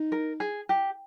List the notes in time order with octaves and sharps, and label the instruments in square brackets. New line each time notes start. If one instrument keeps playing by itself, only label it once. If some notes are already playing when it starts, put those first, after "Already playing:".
Already playing: [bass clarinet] D#4
[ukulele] A#4
G#4
G4